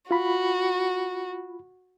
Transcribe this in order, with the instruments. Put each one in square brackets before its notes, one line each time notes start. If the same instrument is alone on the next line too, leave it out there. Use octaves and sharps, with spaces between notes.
[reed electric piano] F4 B5 [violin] F#4